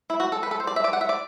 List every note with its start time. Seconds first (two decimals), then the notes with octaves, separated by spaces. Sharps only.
0.10 E4
0.20 F#4
0.32 A4
0.43 B4
0.51 A4
0.60 C5
0.67 D5
0.76 E5
0.84 D5
0.93 F#5
1.01 E5
1.09 D5